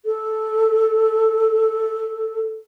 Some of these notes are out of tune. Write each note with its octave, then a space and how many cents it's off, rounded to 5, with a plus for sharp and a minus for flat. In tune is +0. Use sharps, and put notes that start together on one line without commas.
A4 -5